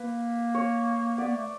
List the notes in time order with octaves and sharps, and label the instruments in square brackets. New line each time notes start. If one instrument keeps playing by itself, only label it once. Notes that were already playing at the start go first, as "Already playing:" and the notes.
Already playing: [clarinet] A#3 [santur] B4
[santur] C#5
[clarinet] B3 [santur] D5
[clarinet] A#3
A3